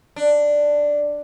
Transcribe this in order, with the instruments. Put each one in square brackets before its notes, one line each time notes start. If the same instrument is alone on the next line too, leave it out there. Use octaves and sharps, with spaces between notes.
[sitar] D4